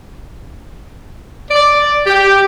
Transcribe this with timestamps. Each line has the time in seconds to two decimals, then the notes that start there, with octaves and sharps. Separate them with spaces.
1.51 D5
2.07 G4